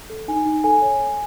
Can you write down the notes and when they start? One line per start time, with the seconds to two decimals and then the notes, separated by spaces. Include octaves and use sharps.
0.10 A4
0.28 D#4 G#5
0.46 D#4
0.64 A4 G#5
0.82 C#5
1.00 A4